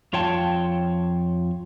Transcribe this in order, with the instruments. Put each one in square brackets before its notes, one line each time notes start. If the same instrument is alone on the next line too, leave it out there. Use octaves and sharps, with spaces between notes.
[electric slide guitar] F2 F4 C#5 G5 A5